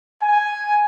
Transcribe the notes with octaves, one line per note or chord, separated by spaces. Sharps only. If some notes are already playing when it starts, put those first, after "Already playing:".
G#5